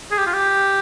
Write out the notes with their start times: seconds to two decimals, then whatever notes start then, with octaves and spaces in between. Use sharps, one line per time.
0.11 G#4
0.18 G4
0.27 F4
0.34 G4